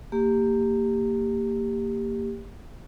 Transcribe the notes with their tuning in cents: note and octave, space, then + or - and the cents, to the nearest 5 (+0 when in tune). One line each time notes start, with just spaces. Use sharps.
A#3 -20 G4 +10